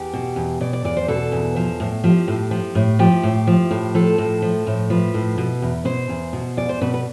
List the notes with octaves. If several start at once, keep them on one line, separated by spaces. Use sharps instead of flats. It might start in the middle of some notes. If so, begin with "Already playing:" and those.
Already playing: E2 G4
B2
E2
B2 D5
D5
E2 D5
C5
B2 A4
E2
F3
A2
F3 G4
A2
F3
A2
F3 G4
A2
F3
A2
F3 A4
A2
F3
A2
F3 B4
A2
B2
E2
B2 C5
E2
B2
E2 D5
C5
B2 B4
B4